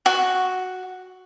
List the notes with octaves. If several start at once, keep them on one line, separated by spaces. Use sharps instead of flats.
F#4